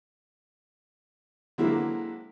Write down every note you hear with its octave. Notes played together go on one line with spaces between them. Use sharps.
D3 F#3 G#3 A#3 C4 E4